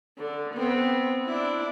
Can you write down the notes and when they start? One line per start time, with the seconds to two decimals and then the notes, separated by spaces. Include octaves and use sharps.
0.18 D3
0.54 B3 C4
1.25 D4 E4